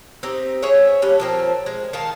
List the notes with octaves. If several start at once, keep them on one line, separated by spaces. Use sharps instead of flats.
C4 D#4 G4
G#4 C#5 E5
G3 C#4 D4
F3 A#3 C4
G#3
D#3 F5 A5